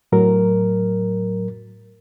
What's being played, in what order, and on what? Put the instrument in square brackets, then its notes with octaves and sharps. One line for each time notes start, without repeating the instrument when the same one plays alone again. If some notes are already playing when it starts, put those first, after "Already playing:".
[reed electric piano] A2 F#3 A#4